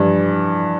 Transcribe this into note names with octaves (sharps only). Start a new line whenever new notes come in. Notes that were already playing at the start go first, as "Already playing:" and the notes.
Already playing: G2 E3 F3